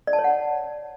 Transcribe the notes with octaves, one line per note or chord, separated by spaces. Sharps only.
D5
A5
C#5
F#5